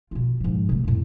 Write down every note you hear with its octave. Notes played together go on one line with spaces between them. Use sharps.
B2 F4
G#2 F3
C3 A3
F2 A2